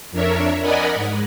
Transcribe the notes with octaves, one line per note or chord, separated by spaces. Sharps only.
F2 D4 A#4 C#5 E5
A#4 D5 D#5 F#5 G#5 B5
G#2